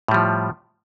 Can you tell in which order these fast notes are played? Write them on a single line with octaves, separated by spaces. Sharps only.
A2 G3 F3